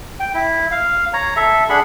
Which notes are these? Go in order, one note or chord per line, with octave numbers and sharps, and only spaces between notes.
G5
E4
F5
C#5 A#5
A4 E5
D4 G#4 F#5 B5